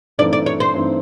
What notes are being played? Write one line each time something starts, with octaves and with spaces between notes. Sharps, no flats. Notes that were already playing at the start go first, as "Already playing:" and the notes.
G2 E3 A3 C4 D#4 D5
D5
C#5
C5
G2 E3 A3 C4 D#4